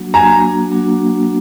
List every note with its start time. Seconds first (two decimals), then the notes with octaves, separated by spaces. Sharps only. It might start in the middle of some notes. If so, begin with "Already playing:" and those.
Already playing: F#3 A#3 D4 F#4
0.14 F#3 A#3 D4 F#4 G#5 A#5
0.71 F#3 A#3 D4 F#4